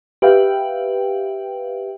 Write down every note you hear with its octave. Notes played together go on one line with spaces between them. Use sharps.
G4 B4 E5 F5 G5